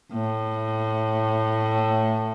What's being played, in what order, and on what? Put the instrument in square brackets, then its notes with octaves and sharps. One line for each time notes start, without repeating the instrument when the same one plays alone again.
[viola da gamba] A2